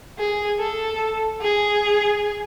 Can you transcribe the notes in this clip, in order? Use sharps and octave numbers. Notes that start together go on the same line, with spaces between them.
G#4
A4
G#4